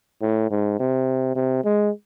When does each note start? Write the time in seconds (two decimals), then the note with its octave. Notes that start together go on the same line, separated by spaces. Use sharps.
0.22 A2
0.51 G#2
0.79 C3
1.36 C3
1.64 G#3